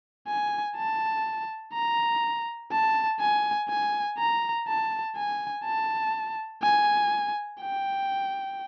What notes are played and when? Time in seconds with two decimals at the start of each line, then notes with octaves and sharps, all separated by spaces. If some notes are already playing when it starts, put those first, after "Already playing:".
0.27 G#5
0.76 A5
1.74 A#5
2.72 A5
3.20 G#5
3.69 G#5
4.18 A#5
4.68 A5
5.17 G#5
5.65 A5
6.63 G#5
7.61 G5